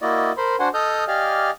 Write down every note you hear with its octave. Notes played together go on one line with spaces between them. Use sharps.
A#3 E4 F#4 D5 D#5
A#4 C5 B5 C6
D4 F#4 C5 F#5 G#5 C6
A4 D#5 D#6 F6 G6
G4 D5 D#5 F5 G#5 F6